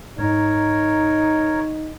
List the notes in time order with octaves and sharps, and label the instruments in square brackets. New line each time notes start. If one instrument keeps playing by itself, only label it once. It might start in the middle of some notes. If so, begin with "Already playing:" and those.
[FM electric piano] G#2 [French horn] D#4 [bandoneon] A#4 C#5